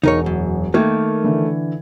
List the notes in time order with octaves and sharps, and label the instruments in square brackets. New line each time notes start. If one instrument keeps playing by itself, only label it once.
[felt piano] E1 [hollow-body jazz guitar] D#4 A#4 C#5
[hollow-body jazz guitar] F#2
[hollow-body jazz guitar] D#3 A#3 [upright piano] A3 [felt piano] G#6
[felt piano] D3 E3